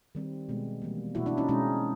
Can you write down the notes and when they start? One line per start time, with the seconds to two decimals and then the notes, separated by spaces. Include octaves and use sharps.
0.15 D#3 G3 C4
0.49 B2 G#3 B3
0.82 E3 G3 A#3
1.15 B2 F#3 A#3 E4 F#4
1.26 D4 E4
1.37 C#4 D#4
1.48 B2 G#3 C4 C#4 D#4